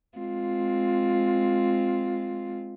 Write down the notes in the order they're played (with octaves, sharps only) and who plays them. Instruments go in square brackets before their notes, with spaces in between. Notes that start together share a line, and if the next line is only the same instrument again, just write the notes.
[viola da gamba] G#3 C4 F4